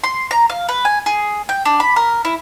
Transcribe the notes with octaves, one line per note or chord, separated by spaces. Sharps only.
C6
A#5
F5
B4
G#5
G#4
G5
D4
B5
A#4
E4